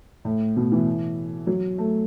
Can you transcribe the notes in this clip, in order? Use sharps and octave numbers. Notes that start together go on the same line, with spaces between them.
A2
B2
E3
F#3
A3